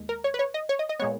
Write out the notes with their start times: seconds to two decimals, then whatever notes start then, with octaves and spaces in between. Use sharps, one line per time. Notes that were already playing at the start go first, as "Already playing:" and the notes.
Already playing: D#2 G#3
0.09 A#4
0.24 C#5
0.34 B4
0.39 C#5
0.54 D#5
0.69 C#5
0.79 D#5
0.89 D#5
0.99 A#2 G#3 B3 C#5